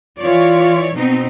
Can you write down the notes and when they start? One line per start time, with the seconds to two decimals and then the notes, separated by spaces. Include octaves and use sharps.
0.19 E3 F4 C#5 D5
0.95 B2 C4 D#4